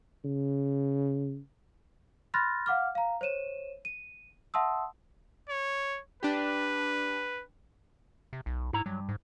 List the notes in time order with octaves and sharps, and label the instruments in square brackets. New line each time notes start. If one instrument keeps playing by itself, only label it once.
[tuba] C#3
[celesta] B5 C6 F6 F#6 A6 A#6
F5 F#5 D6 F6
F5 A#5
C5 C#5 D#7 E7
D#7
E5 F#5 A5 C6 D#6 E6
[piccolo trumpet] C#5
[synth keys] D4 G4 [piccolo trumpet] B4
[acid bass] C3
B1
[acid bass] G#2 [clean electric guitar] E4 A#5
[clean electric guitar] G2 [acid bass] F#3
[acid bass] G#2